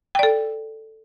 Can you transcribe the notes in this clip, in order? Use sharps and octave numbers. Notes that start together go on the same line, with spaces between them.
A4 D5 G5